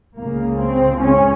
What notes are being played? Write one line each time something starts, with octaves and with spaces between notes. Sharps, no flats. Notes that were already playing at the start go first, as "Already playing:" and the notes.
C#2 C#3 A#3
C4
C#4